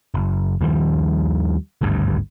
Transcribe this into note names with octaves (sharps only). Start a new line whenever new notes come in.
F#1
D#2 D#3 F3 G3
G#1 D2 G2